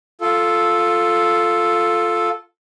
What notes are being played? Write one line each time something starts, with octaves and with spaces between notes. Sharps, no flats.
F4 A4